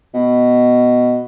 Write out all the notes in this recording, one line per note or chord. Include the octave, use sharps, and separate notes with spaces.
B2